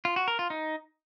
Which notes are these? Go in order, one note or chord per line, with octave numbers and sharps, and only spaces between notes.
F4
F#4
A#4
F4
D#4